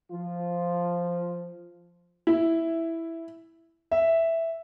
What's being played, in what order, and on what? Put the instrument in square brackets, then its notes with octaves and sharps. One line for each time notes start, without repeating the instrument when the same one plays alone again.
[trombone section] F3 F4
[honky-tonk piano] E4
[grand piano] E5